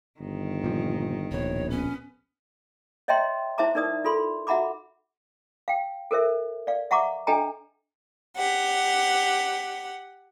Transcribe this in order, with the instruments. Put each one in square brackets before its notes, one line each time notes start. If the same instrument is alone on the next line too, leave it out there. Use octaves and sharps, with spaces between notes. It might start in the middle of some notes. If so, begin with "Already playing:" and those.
[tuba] G1 [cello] D#3
[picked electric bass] A#2 F3
[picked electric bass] D1 B2 [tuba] A#1 [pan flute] C#5
[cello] B3 [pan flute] C#4
[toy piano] C#5 D#5 E5 G5 A#5 C6
E4 C5 E5 A5 A#5 D6
D#4 A#4 D5 D#6
F4 A4 B5 C6
F#4 E5 F#5 A#5 B5 D6
F5 G5
A4 A#4 C5 E5
D5 F5
E5 F#5 A#5 C#6 D6
D4 A4 D#5 G5 G#5 A#5
[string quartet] G4 F#5